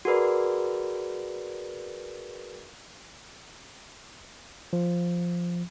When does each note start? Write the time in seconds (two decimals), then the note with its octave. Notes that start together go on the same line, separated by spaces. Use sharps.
0.05 F#4 G#4 A#4 B4 D5
4.73 F3